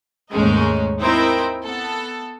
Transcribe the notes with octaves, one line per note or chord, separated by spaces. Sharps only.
D#2 G#2 G#3 A3 C#4 D#4
C4 D#4 E4 A#4 C5 G5
B3 A4